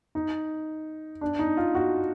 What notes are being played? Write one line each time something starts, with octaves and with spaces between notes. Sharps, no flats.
D#4
D4
D#4
F4
F#4